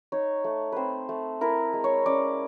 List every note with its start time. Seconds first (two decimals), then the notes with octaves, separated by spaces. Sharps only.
0.12 D#4 C#5
0.44 A3
0.72 C4 B4 C5
1.09 A3
1.41 E4 A#4
1.73 G#3
1.84 C#5
2.06 C#4 D5